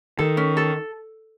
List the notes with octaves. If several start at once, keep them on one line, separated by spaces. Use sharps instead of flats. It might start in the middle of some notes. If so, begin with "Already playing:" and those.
D#3 A4
C#4
A4